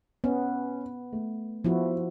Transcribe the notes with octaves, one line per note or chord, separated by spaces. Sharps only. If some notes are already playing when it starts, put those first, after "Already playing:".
B3 C#4
A3
F3 B3 E4 F#4